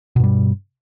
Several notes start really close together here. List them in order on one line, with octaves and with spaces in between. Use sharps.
B2 G2 G3